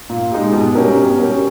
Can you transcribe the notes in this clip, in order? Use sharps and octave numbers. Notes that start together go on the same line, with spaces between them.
A#2
G#3 D#4 G4
B2
G3 C#4 G4 A#4
B2
G3 C#4 G4 A#4